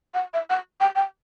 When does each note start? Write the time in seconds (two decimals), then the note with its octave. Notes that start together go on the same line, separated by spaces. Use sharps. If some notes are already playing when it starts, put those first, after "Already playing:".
0.14 F#5
0.34 E5
0.50 F#5
0.80 G5
0.95 G5